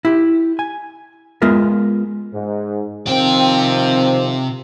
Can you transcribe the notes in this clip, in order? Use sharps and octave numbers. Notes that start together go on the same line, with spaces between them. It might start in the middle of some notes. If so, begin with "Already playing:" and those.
E4 G4
G#5
G#3 B3 F4 A#4 E5
G#2
C3 D#3 F3 C4 G5